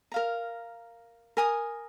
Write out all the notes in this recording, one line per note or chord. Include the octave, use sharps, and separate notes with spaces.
A#4 F5 A#5
A#4 G#5 D#6